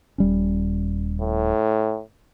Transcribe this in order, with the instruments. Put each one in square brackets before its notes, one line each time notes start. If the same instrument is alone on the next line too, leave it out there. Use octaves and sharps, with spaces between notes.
[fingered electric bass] D#1 G3 C#4
[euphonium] A2